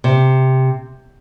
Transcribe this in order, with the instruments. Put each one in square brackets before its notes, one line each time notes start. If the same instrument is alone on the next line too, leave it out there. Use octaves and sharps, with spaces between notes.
[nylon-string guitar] C3